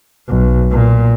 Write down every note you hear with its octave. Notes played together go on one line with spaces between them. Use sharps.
B1
A#2